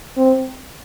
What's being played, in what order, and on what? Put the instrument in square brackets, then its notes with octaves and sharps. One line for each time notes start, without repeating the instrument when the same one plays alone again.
[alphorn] C4